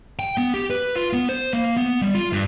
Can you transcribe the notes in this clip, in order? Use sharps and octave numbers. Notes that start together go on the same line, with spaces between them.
G5
B3
G4
B4
F4
B3
C5
A#3
B3
G3
F4
G2